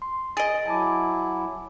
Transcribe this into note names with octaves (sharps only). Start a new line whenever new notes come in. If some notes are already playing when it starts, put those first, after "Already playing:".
C6
G#4 D#5 A6 D7
F#3 E4 G#5 A5 D6